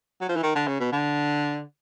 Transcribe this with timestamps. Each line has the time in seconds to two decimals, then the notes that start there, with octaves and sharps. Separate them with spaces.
0.21 F#3
0.29 F3
0.36 E3
0.43 D#3
0.55 D3
0.67 C#3
0.80 B2
0.92 D3